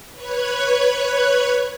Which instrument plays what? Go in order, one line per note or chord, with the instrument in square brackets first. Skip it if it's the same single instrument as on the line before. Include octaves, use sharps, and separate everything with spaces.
[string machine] B4 C#5 F#6 G#6